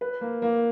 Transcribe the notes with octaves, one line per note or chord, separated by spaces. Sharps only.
B4
A#3
A#3